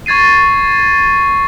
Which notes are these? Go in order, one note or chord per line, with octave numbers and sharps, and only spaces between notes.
C#6 G#6 A6 C7 D#7